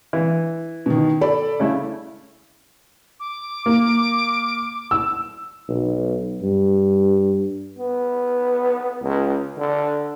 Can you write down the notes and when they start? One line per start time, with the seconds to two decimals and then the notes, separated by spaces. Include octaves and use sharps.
0.13 E3
0.86 B2 D#3
1.21 A4 D5 B5
1.60 C#3 A3 E4
3.20 D6
3.66 A#3
4.91 E6
5.69 B1
6.42 G2
7.78 B3
9.02 C#2
9.59 D3